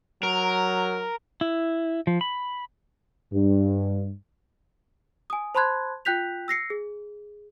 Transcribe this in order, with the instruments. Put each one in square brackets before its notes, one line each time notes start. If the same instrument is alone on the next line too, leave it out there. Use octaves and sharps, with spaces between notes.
[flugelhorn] F#3 [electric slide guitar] A#4
[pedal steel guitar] E4
F3
B5
[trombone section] G2
[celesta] G#5 D#6
C5 A5 B5 C6 F#6 G#6
F4 G5 F#6 G6 B6 F7
E6 A#6 C7 C#7
G#4